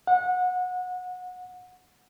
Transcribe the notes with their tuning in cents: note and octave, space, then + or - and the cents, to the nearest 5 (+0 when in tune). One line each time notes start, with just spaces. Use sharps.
F#5 -25